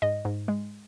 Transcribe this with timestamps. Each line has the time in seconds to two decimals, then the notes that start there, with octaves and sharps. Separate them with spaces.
0.02 G#2 D#5
0.25 G#2
0.48 G#3